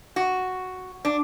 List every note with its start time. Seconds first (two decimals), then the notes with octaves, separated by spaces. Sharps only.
0.16 F#4
1.05 D4